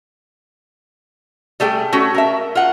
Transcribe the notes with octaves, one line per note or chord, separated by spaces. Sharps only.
G3 A3 G#4 G5
A3 C#4 F#4
A#4 E5
F4 F#5